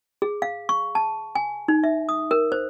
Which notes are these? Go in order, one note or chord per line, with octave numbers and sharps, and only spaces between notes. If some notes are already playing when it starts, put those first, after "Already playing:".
G#4
F5
C#6
A5
G#5
D#4
E5
D#6
A#4
C5